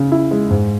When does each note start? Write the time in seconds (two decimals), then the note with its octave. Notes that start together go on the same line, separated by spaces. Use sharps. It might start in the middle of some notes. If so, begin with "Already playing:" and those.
Already playing: C#3
0.12 E4
0.31 G#3
0.50 G#2